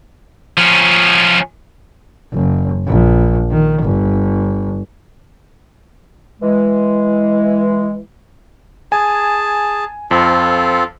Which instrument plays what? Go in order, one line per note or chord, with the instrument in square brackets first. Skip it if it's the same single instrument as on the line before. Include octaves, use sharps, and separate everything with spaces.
[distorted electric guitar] F3 C#4
[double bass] F#1
A#1
D#3
G1
[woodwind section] E3 G#3
[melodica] G#4 A5 [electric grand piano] G#5
[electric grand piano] F2 [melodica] C4 F4 A4